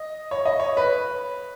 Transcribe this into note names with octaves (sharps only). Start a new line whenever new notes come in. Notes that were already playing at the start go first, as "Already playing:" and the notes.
Already playing: D#5
C#5
D#5
C#5
B4